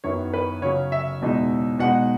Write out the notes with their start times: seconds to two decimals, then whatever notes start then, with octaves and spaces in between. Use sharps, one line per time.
0.04 F#2 D#3 F#3 B3 E4 C#5
0.34 B4
0.62 C#3 F#3 C#4 C#5
0.92 E5
1.22 E2 B2 G#3 D#4
1.79 B2 G#3 D#4 F#5